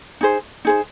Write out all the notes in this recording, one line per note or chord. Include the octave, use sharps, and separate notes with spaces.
D#4 G#4 C5
D#4 G#4 C5